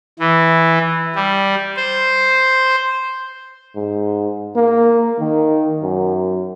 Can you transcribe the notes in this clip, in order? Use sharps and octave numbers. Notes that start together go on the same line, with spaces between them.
E3
G3
C5
G#2
A#3
D#3
F#2